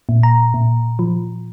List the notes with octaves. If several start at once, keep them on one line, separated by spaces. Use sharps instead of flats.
A#2
A#5
A#2
F3